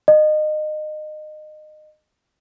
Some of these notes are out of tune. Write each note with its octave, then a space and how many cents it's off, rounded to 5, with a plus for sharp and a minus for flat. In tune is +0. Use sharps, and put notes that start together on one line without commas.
D#5 -25